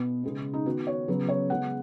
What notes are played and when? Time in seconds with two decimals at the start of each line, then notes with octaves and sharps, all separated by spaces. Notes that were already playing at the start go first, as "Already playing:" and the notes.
Already playing: B2 B3
0.24 C#3 G#3 B3
0.53 D#4
0.66 D#3 B3 F#4
0.87 C#5
1.08 C#3 F#3 B3 B4
1.29 C#5
1.50 C#3 G#3 B3 F#5